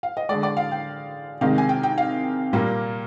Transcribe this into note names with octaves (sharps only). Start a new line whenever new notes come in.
F5
D#5
D3 G#3 D5
D5
F5
G5
C3 D#3 G#3 F5
G#5
G5
G5
F5
A#2 G3 A#3